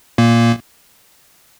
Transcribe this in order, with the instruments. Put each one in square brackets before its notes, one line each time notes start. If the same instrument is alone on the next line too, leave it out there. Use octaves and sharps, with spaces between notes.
[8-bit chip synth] A#2 A#3